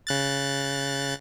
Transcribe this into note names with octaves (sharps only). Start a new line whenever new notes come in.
C#3 F#6 A6